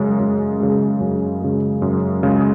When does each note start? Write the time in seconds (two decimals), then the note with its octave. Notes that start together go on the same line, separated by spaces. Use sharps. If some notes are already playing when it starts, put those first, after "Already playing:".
Already playing: F#2 C#3 G#3
0.20 F#2
0.60 C#3 G#3
1.00 F#2
1.42 C#3 G#3
1.82 F#2
2.23 C#3 G#3